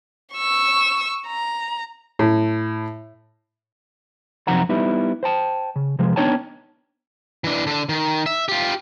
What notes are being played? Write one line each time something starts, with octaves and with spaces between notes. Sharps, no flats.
C#6 E6
A#5
A2
F#2 C3 F3 D#4 F#5 A#5
G3 B3 D#4 E4
C5 G5 A5
C#3
C3 F3 G#3
B3 D4 D#4 C#5 G5 A5
E3 D4
D3 D4
D#3
E5
F4 G4